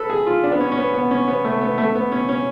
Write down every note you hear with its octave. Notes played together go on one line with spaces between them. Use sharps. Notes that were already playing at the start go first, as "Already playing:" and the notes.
Already playing: A4 B4
G#4
F4
D4
B3
C#4
C#4
B3
B3
C#4
B3
A3
B3
A3
B3
C#4
C#4